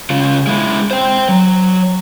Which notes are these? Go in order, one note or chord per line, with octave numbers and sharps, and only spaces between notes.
C#3 F4
G#3 E4
C5 G5
F#3